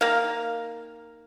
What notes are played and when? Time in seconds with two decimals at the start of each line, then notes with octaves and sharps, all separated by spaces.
0.01 D#3 A#3 F5